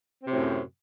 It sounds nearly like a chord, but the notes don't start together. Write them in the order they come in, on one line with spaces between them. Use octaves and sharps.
C4 C3 F#3 A2 F#2